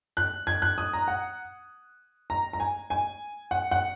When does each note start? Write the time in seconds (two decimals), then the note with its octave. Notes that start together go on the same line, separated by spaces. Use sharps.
0.17 F#6
0.47 G#6
0.62 F#6
0.78 D#6
0.93 A#5
1.08 F#5
2.30 A#5
2.53 A#5
2.60 G#5
2.90 G#5
3.51 F#5
3.71 F#5